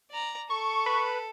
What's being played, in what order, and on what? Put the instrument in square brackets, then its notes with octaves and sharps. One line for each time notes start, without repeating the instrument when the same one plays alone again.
[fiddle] D5 A#5
[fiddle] A4 [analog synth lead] C#6
[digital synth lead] B4